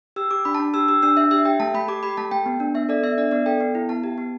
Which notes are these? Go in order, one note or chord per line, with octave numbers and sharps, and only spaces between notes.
G4 E6
G4 D6
D4 B5
A5
D4
G4 E6
G4 E6
D4 E6
D4 E5
G4 E5
G4 G5
A3 A5
A3 B5
G4 D6
G4 B5
A3 A5
A3 G5
B3
D4
B3 E5
A4 D5
B3 E5
D4 D5
B3 D5
A4 G5
B3
E4
B3 A5
G4
B3